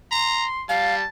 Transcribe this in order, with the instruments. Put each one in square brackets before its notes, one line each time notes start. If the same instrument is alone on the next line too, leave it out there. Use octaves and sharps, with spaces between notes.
[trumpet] A#5 [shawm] C6
[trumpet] G3 [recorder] F5 [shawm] A5